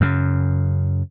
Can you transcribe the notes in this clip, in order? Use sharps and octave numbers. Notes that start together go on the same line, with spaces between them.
F#2 C#3